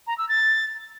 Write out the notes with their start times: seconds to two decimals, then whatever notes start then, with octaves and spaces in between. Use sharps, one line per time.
0.07 A#5
0.18 E6
0.29 A6